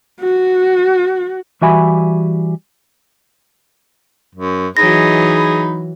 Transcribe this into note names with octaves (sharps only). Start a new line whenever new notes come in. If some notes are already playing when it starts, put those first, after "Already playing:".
F#4
E3 G3 F#4 E5 G#5 B5
F#2
E3 F#3 D#4 G#4 B5 A#6